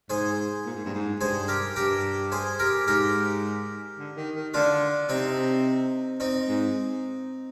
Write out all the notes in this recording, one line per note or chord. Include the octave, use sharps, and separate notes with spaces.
G#2 G#4 C5
A#2
G#2
G2
G#2
G2 G#4 C5
G4 A#4
G2 G4 A#4
G#4 C5
G4 A#4
G#2 G4 A#4
D3
D#3
D#3
D3 D4 F4
C3 C4 D#4
C4 D#4
G#2